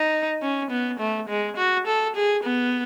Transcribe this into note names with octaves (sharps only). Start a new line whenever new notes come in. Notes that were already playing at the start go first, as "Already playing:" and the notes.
Already playing: D#4
C#4
B3
A3
G#3
F#4
A4
G#4
B3